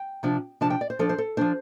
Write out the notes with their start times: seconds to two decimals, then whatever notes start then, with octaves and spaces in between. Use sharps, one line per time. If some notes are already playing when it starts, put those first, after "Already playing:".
Already playing: G5
0.23 C3 F3 D4
0.61 C3 F3 D4 A5
0.70 G5
0.81 D5
0.90 C5
0.99 F3 D4 A4
1.09 C5
1.18 A4
1.37 F3 D4 C5